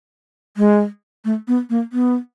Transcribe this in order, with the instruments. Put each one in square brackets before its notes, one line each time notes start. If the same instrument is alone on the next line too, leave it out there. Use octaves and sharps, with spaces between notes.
[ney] G#3
A3
B3
A#3
B3